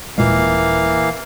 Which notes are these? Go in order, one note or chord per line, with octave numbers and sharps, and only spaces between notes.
D#1 A#2 E3 G#3 A#3 F5